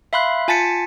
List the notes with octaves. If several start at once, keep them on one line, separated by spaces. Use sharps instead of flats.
E5 F5 B5 C6 F#6
F4 G#5 A5 A6 B6 C#7